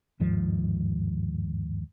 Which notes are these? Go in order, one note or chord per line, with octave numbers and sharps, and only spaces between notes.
G1 D#2 G#2 F3